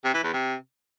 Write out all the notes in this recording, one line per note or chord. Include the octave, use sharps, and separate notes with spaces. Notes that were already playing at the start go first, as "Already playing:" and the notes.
C3
E3
E2
C3